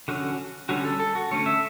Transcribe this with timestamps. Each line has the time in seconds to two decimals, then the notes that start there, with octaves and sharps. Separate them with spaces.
0.08 D3 F#3 C#4 F#4
0.69 D3 G3 C#4 F#4
0.85 A4
1.00 A4
1.15 F#4
1.31 D3 A3 C#4 C#5
1.46 E5